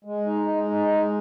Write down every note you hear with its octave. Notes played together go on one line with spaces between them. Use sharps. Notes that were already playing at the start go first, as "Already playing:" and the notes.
G#3
D#4
G#3
D#4
G#3